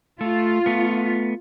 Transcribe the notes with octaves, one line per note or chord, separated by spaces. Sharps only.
A3 F4
A3 B3